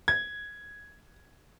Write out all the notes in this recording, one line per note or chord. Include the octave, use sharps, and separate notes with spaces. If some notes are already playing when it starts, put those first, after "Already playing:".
G#6